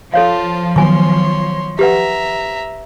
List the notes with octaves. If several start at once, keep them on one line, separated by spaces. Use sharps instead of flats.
F3 F4 A4 C#5 F5 A5
D#3 F#3 B3 C#5 G#5 C6 C#6
G4 B4 E5 F#5 A#5